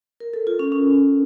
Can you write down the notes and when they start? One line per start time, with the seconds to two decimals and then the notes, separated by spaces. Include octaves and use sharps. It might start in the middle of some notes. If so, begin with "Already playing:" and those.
0.20 A#4
0.34 A4
0.47 F4
0.59 C#4
0.72 C#4